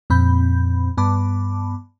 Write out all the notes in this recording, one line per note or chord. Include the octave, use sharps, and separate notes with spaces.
F2 A#2 C4 B5 G6
G2 B3 A5 B5 D6